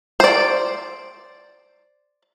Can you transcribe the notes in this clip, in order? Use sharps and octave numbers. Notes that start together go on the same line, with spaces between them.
C5 D5